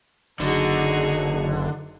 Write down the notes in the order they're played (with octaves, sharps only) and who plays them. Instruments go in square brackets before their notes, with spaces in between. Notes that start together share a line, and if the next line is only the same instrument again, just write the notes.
[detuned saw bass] F#1 [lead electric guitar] D3 [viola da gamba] D#4 F#4 G#4